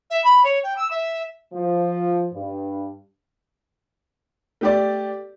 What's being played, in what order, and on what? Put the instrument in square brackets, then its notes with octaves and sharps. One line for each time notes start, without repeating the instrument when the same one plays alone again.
[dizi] E5
B5
C#5
G5
E6
E5
[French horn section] F3
G2
[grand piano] A3 G4 D5